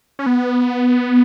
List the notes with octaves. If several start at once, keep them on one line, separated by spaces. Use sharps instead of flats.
C#4
B3